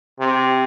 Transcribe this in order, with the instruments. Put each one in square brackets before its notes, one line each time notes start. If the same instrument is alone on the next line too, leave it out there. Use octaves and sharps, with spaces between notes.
[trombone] C3